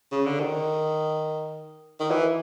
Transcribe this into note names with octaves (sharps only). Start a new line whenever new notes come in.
C#3
D3
D#3
D#3
E3